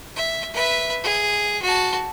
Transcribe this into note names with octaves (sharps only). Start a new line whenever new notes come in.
E5
B4 E5
G#4
F#4 A5